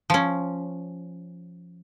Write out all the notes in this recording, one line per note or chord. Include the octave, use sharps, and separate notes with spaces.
F3 C#4